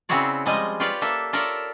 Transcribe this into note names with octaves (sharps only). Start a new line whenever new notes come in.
C#3 C4 E4 F#4 C#5 D5
F3 G3 G#3 D#5 G#5
F4 G4 B4 C#5 D5 F5
A#3 A4 E5
F4 A4 A#4 C#5 D5 E5